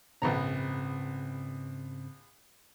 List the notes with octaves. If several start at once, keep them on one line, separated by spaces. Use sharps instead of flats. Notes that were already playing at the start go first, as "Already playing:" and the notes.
A#1 G#2 C#3 B3 C4 A#5